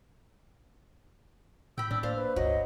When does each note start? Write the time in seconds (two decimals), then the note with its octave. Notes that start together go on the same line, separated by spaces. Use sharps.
1.78 A2 G5 B5 E6
1.91 A2 G3 D4 E6
2.03 A#3 C5 D5 F5
2.16 B4
2.36 G1 C#2 F#3 D#5